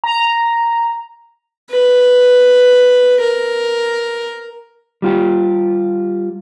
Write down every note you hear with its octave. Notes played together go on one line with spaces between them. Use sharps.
A#5
B4
A#4
G3 F4 G4